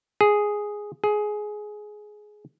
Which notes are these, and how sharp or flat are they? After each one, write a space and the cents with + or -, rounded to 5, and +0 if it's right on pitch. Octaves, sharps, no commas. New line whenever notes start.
G#4 +0
G#4 +15